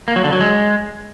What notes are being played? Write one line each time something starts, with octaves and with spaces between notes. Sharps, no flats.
A#3
F#3
D3
F#3
G#3